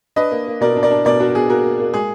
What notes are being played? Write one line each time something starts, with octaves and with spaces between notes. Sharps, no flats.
D4 B4 D#5
A#3
A#3
B2 A#4 D5
D4
A#4 D5
D4
B2 A#4 D5
D4 F#4 A#4
B2 G#4
A#3 F#4 A#4
A#3
A#3
G#3 G#4